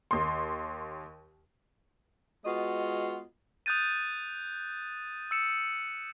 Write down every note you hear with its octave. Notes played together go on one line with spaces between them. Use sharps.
D#2 C6
G#3 B3 F4 F#4 D#5
D#6 F#6 G6 A6 D#7
E6 C#7 E7